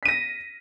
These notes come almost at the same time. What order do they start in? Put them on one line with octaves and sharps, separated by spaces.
B6 D#7 A#6